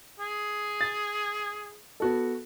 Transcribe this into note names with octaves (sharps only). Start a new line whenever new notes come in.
G#4
A6
B3 F#4 A4